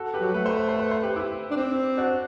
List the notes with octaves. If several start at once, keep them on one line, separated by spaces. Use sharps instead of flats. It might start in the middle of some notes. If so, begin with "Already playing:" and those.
Already playing: F#4 A4
G4 B4
F#3
A3 B4
C5
B4
C5
B4
C5
G4 B4
E4 G4
D4
C4
D4 F#4